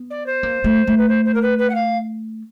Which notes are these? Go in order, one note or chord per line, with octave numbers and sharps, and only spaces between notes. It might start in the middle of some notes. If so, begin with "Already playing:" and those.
Already playing: B3
D5
C5
A#3
A3
A3
B4
C5
C5
A#4
B4
B4
F#5
F5